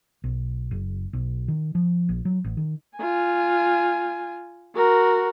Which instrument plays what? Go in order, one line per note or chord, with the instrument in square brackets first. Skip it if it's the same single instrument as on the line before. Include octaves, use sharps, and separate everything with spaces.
[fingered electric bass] B1
F#1
B1
D#3
F3
A#1
F#3
A1
D#3
[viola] F4 G#5
F#4 A#4